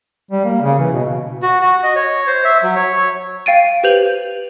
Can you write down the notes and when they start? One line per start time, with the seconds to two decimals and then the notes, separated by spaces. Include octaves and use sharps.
0.31 G3
0.45 A#3
0.61 C#3
0.79 E3
0.93 B2
1.42 F#4
1.62 F#4
1.83 D#5
1.96 C#5
2.27 C5
2.44 E5
2.63 F#3
2.76 C#5
3.46 F5 G5 A6 D7 D#7
3.83 G4 B4 C5 G6 F7 F#7